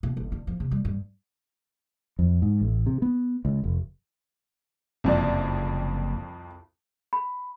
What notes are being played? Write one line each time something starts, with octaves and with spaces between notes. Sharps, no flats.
B2
G1
D3
F3
C3
G3
G2
F2
G#2
A1
C3
B3
C#2
F1
F#1 C2 F2 D5
B5